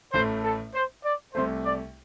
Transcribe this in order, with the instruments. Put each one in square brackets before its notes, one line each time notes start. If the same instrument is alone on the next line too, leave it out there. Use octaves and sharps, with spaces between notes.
[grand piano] A1 A2 A3 [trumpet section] C5
[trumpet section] A4
C5
D5
[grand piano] C2 C3 A3 [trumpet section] C5
[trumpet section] D5